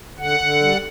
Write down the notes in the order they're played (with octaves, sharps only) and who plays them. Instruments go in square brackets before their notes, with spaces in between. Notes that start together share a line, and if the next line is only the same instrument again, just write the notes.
[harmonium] D3 [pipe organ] F#5
[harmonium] D3
G3